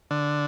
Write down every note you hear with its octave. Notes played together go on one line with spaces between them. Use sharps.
D3